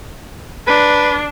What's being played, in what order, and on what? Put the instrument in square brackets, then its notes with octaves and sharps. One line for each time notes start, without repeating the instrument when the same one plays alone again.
[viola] D4 [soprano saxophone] B4